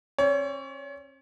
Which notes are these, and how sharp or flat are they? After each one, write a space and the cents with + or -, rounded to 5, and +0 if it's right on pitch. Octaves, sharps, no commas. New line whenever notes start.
C#4 -45 C#5 +35